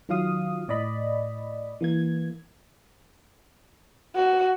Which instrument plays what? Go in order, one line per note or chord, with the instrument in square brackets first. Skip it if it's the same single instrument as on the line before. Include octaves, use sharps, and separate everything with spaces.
[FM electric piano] D#3 F#3 F4 F5 D#6
A2 D5 D#5 B5
E3 A#3 G#6
[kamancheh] F#4